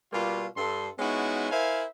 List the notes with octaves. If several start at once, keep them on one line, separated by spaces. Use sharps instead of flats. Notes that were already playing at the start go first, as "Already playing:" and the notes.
B2 G3 A#3 F4
G2 A4 C6
G#3 B3 C#4 D#4 E4 F#4
E4 A#4 C5 E5 F5 G#5